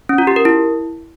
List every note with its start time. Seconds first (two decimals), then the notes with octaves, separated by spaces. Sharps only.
0.09 C#4
0.18 F4
0.27 G4
0.36 A#4
0.45 E4